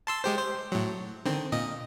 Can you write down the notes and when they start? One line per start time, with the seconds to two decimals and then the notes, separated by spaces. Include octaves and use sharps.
0.07 A5 C6 E6
0.24 G#3 G4 C5
0.38 C5
0.72 A2 F#3
1.25 D3 D#3 C4
1.52 A#2 D#5